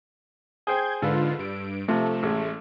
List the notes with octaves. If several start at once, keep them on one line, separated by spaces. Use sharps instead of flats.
G#4 C5 G5 G6 G#6
G#2 D3 F4 A4 B4
G2 D7
C3 F3 A3
A1 G#3